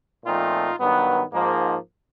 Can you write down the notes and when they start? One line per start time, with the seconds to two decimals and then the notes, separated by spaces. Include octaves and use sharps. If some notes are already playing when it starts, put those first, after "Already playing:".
0.25 A#2 F3 A3 C4 D#4 F4
0.79 G2 D#3 F#3 B3
1.33 G#2 F3 A#3